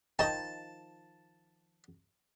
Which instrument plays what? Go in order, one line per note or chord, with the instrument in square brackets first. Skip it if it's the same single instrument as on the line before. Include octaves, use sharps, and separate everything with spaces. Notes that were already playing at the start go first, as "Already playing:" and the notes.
[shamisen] D#3 F3 D#5 [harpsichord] A5